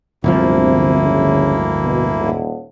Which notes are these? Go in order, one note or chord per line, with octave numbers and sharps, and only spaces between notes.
D1 G1 D2 C3 F3 A#3 E4
C#3
B2
D#1